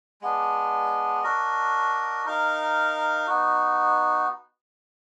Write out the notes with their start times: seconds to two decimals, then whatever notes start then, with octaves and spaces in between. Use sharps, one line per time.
0.22 G#3 B3 D4
1.24 D4 F#4 A#4 D#5
2.26 D#4 A#4 F5
3.27 B3 D#4 F#4